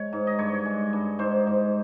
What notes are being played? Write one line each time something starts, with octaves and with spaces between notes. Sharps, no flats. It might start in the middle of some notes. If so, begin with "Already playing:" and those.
Already playing: G#3 C#5
G#2
D#5
G2 C#5
G#3
G2
G#2 C5
G#2